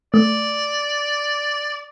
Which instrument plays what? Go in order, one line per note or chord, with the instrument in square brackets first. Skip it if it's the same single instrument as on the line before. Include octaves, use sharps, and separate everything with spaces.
[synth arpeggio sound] A3 [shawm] D5